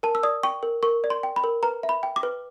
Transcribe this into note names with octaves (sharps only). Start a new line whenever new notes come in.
A#4 A5
E6
D5 D#6
G5 C#6
A#4
A#4 C#6
D5
C6
G5
B5
A#4
B4 A#5
E5
B5
G5
D6
B4